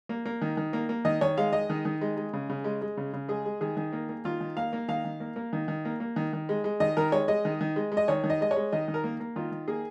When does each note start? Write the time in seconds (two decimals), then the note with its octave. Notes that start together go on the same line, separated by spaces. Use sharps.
0.09 A#3
0.25 A#3
0.42 D#3
0.57 D#3
0.73 A#3
0.89 A#3
1.05 D#3 D#5
1.21 D#3 C#5
1.37 G#3 F5
1.53 G#3 D#5
1.70 D#3
1.85 D#3
2.01 G#3
2.17 G#3
2.33 C#3
2.49 C#3
2.64 G#3
2.82 G#3
2.97 C#3
3.13 C#3
3.28 G#3 G#4
3.45 G#3
3.61 D#3 G#4
3.77 D#3
3.93 A#3
4.09 A#3
4.25 D#3 F4
4.41 D#3
4.57 A#3 F5
4.73 A#3
4.88 D#3 F5
5.05 D#3
5.20 A#3
5.36 A#3
5.53 D#3
5.68 D#3
5.85 A#3
6.00 A#3
6.16 D#3
6.33 D#3
6.49 G#3
6.64 G#3
6.80 D#3 D#5
6.97 D#3 A#4
7.12 G#3 C#5
7.28 G#3 D#5
7.45 D#3
7.61 D#3
7.76 G#3
7.92 G#3
7.97 D#5
8.08 D#3 C#5
8.24 D#3
8.30 D#5
8.41 G#3 D#5
8.51 C#5
8.56 G#3
8.72 D#3 D#5
8.88 D#3
8.94 A#4
9.04 A#3
9.20 A#3
9.36 D#3 F4
9.52 D#3
9.68 A#3 G#4